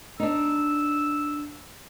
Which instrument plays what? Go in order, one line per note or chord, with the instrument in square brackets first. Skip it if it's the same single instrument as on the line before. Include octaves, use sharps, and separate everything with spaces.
[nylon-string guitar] D4 D#4 [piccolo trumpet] E6